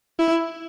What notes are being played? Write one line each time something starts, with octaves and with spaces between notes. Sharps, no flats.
E4